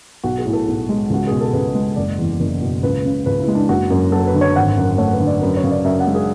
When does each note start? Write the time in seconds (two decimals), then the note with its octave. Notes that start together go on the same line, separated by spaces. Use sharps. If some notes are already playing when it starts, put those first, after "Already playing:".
0.24 B1 F#4
0.38 G#4
0.46 A2
0.53 A4
0.68 B1
0.89 G#3
1.10 C#2 F#4
1.27 B2 G#4
1.41 A4
1.53 C#2 B4
1.75 G#3
1.96 F#1 D5
2.18 E2
2.40 F#1
2.62 B2
2.83 C#2 B4
3.05 C#3
3.26 C#2 B4
3.40 E4
3.48 G#3
3.55 D4
3.69 F#1 F#4
3.90 F#2
4.12 F#3 A4
4.27 B4
4.34 D3
4.41 C#5
4.55 G#1 F#5
4.77 F#2
4.98 A3 C#5
5.13 B4
5.20 D3
5.27 D5
5.42 F#2 B4
5.57 C#5
5.64 C#3
5.71 D5
5.84 F#2 E5
6.00 F#5
6.07 G#3
6.14 G#4